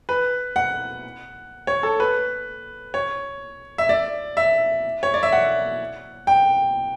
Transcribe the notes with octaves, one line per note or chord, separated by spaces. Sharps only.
B4
F#5
C#5
A4
B4
C#5
E5
D5
E5
C#5
D5
E5
F#5
G5